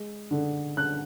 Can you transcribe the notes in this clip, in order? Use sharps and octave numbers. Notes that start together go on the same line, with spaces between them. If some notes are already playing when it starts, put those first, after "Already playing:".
Already playing: G#3
D3
D3 F#6